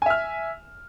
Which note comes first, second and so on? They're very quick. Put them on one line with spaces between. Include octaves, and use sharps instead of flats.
G#5 E5 F6